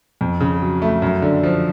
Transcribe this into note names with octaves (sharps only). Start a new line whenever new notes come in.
F2
C#3
F#3
A3
F#2
D3
F3